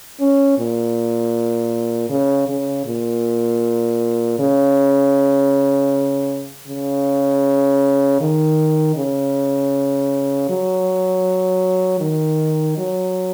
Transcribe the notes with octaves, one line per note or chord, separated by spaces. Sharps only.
C#4
A#2
C#3
C#3
A#2
C#3
C#3
D#3
C#3
F#3
D#3
F#3